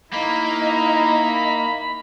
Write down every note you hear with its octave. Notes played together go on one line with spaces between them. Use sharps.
A#3 D#4 E4 D#5 B5